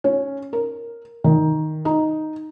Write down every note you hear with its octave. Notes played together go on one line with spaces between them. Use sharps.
C#4
A#4
D#3
D#4